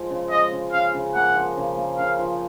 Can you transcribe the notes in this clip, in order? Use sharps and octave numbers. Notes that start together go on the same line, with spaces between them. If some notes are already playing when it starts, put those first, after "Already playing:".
Already playing: F3 G#3
C#3
G#3 D#5
C#3
C#3 F5
C#3
A#3 F#5
F3
C#3
A#3
C#3 F5
F3